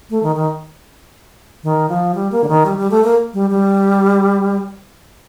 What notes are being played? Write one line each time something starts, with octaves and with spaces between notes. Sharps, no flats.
A3
D#3
D#3
D#3
F3
G3
A#3
D3
D#3
G3
G3
A3
A#3
G3
G3